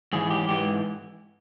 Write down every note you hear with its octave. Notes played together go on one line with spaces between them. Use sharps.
G#2 E3 G#4
G4
G#2 E3 G4